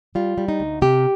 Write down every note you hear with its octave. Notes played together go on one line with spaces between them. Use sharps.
G3 F4
G3
D#4
D2
C3 G4